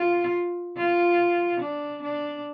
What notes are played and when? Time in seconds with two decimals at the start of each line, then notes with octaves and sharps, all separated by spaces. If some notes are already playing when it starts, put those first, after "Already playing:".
Already playing: F4
0.77 F4
1.60 D4
2.02 D4